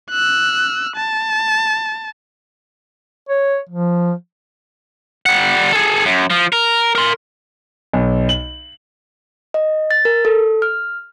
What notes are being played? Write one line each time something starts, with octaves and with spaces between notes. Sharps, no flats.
E6 F#6
A5
C#5
F3
G3 F#5
G#4 A4
F#2
F3
A#4
A#4 C6
B1
F#7
D#5
A6
A#4
A4
F6